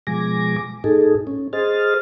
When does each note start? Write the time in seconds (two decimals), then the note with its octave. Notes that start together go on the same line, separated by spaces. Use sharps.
0.07 B2 F3 G#3 G#5 D6 A#6
0.84 A2 D#4 G#4 A4
1.27 C#4
1.53 G#4 C5 D#5 F6 A6